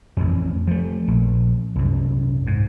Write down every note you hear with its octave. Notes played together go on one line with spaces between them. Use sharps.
A1 F2
F3 A3
A#1
C2 F#2
G#2